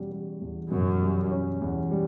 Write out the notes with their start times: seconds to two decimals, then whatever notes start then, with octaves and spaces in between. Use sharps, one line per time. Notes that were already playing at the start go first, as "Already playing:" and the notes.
Already playing: E2 B2 G3 C#4
0.12 G3
0.41 E2
0.71 F#2 B2
1.02 G3
1.31 C#4
1.61 E2
1.91 G3